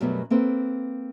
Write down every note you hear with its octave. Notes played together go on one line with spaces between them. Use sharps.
F#2 B2 F#3 G3 A3 B3
A#3 C4 A4 B4